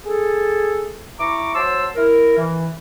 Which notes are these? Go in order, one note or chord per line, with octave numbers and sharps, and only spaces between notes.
G#4 A4
E4 A#5 C#6 D6
F#3 C5 A5 C6 E6
E4 A#4
E3